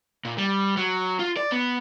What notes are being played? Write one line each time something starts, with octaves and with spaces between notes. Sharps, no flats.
A#2
G3
F#3
F4
D5
B3